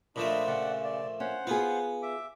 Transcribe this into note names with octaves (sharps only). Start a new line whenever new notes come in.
A#2 F3 A3 D4 D#5 B5
C#3 D5 F#5
D5
C#4 C5 F#5
B3 F4 G#4
E5 D6